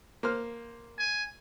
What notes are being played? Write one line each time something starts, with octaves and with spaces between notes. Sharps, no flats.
A#3 C5 F6
G#5